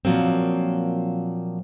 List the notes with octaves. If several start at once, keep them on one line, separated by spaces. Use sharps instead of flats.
A#2 F3 F#3 A#3 C4